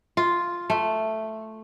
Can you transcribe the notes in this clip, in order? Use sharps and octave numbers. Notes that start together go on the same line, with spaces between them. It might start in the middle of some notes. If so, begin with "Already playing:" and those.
F4
A3